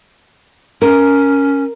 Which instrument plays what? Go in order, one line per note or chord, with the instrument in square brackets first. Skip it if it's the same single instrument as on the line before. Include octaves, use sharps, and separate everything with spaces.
[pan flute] C#4 [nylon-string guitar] A#4